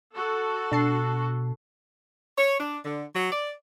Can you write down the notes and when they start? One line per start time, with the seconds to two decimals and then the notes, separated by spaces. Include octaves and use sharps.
0.15 F#4 A4
0.72 B2 D4 A5 C7
2.38 C#5
2.60 D4
2.85 D3
3.14 F#3
3.32 D5